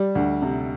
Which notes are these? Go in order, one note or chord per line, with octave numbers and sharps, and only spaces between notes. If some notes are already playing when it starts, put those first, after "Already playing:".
Already playing: G3
D2
C3